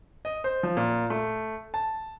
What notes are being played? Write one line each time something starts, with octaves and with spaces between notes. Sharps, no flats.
D#5
C5
F3
A#2
A3
A5